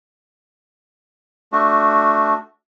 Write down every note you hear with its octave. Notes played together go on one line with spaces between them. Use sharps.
A3 D4 F#4